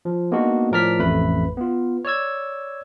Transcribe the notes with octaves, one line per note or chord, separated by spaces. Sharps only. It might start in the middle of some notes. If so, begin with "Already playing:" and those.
F3
G#3 A#3 B3 D4 D#4 F#4
A2 F3 A#4 D5 F6 B6
A1 F2 A3 B4 B5
B3 F4
C#5 D5 E6 G#6